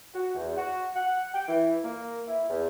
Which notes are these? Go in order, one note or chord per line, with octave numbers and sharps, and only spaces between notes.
F#4
E2
F#4
F#5
G5
E3
A#3
E4
E2